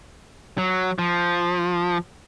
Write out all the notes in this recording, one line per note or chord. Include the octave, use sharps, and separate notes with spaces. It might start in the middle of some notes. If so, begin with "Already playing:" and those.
F#3
F3